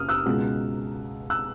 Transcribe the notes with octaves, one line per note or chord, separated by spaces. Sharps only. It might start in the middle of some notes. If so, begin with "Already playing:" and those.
Already playing: F#1 C#3 D#6 F6
E6 F#6
C#2 B2 G#3 C#4
E6 F#6